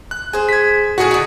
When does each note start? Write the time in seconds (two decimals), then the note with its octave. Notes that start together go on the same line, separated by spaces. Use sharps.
0.11 F#6
0.33 G#4 C5
0.49 G#6 B6
0.98 A2 C3 F#4 G#4 F#5
1.11 D3 D#4